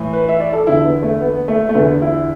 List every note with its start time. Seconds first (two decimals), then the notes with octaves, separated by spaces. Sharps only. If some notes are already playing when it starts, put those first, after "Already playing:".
Already playing: A2 E3
0.13 B4
0.29 E5
0.40 D5
0.53 A4
0.67 E2 D3 E4
0.85 B3
1.02 A3
1.21 B3
1.48 A3
1.69 A3
1.75 E2 D3 B3
2.02 E4